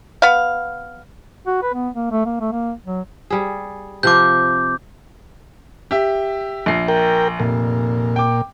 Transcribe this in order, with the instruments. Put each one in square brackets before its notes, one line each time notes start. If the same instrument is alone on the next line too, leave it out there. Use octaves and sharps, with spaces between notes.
[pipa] B3 F5
[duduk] F#4
B4
B3
A#3
A3
A#3
A3
A#3
F#3
[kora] G3 G#4
[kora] C3 F3 F4 [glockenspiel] D6 G6
[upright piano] G4 E5
A#1 C7
[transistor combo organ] A#4 G5
[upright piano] F1 [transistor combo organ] A#2
[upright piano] G5 D6